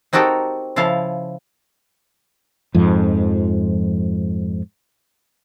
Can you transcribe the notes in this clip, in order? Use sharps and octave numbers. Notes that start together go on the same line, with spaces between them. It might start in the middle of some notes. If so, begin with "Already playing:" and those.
C4 D#4 F#4 G4 A4 A#4
C#3 F3 E4 A4 F5
F2 G#2 F3